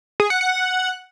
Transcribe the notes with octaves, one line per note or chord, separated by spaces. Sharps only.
G#4
F#5
F#5